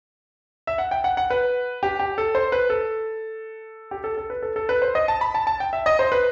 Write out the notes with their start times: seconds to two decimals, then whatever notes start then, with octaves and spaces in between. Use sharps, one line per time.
0.67 E5
0.78 F#5
0.91 G5
1.04 F#5
1.17 F#5
1.30 B4
1.83 G4
2.00 G4
2.18 A4
2.35 C5
2.52 B4
2.70 A4
3.91 G4
4.04 A4
4.18 A4
4.30 B4
4.42 A4
4.56 A4
4.69 B4
4.82 C5
4.95 D#5
5.08 A5
5.21 B5
5.35 A5
5.47 A5
5.60 G5
5.73 E5
5.86 D#5
5.99 C5
6.12 B4